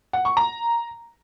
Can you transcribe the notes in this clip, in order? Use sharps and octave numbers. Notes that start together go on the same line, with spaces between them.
F#5
C#6
A#5